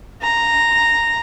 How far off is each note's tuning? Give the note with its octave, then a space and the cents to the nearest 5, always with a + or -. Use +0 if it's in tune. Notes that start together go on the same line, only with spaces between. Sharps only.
A#5 -5